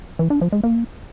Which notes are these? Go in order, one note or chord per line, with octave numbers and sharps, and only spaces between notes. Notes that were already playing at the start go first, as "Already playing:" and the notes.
E3
D4
F3
G#3
A#3